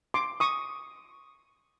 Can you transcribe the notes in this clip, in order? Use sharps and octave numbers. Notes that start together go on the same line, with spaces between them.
C6 D6
C#6 D#6